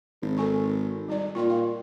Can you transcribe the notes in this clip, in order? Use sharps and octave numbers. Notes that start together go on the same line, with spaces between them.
G#1
A4 G#5 C#6
G3 D#4 D5
A#2 F4 G5 C6
F5